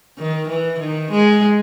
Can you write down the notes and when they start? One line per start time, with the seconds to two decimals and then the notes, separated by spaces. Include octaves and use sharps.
0.17 D#3
0.48 E3
0.79 D#3
1.11 G#3